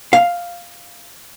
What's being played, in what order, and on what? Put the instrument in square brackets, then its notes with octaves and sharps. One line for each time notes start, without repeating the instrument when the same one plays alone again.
[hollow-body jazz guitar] F5